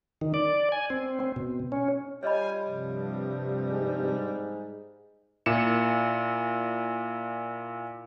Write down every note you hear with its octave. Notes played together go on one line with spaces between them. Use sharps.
D#3
D5
G#5
C4
C4
B2
C#4
G3 F4 C#5 D#5 G#5 B5
G2 C3 F3
G#2
A#2 E4 C#7 E7